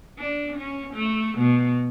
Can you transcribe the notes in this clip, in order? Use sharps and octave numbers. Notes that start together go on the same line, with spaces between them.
D4
C#4
A3
B2